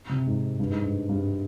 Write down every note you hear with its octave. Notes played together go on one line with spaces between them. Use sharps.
C3
G#2
G2
G#2
G2
G2